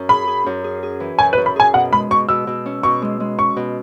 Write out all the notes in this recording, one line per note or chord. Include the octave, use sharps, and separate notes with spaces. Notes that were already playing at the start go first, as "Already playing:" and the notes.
Already playing: F#2 C#4
G#4 B5
G#4
F#2
G#4
G#4
E3
F#2 G#5
B4
F#2
B5
G#4 G#5
B2 F#5
G#3 B5
B2 C#6
B2 E6
B2
C#4
B2 C#6
G#3
G#3
C#4 C#6
B2